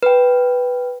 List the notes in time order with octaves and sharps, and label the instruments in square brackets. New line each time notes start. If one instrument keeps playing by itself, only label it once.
[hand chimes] B4 G5